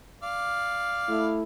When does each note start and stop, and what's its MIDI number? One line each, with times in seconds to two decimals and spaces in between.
0.23 1.37 74
0.23 1.37 77
1.08 1.43 57
1.08 1.43 64